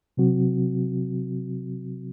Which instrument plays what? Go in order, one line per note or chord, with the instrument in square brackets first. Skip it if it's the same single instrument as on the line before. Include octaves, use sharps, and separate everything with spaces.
[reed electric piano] C3 F#3 C4 F#4